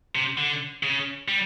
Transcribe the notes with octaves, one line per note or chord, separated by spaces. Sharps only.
C3
D3
C#3
G3